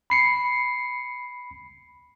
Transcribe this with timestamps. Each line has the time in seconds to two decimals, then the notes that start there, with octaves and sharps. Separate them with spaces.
0.10 B5 C7 C#7